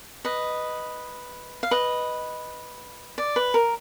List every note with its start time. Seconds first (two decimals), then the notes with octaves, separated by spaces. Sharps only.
0.25 B4 D#5
1.63 F5
1.71 B4 D#5
3.18 D5
3.36 B4
3.54 A#4